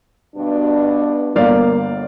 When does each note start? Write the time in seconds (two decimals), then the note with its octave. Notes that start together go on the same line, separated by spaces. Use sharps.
0.36 G2 B2 D4
1.35 G1 A#3 D5 F5